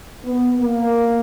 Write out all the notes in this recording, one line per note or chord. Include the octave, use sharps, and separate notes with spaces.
B3
A#3